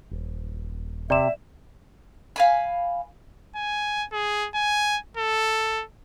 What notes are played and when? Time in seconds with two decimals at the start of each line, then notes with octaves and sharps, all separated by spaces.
0.11 D#1
1.10 C3 D5 E5 E7
2.36 F5 G#5 B5
3.56 G#5
4.13 G#4
4.55 G#5
5.17 A4